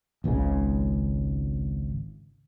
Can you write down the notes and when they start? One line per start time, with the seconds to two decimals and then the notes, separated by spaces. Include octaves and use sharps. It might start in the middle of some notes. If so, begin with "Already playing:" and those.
0.24 G#1 C#2 G#2 C#3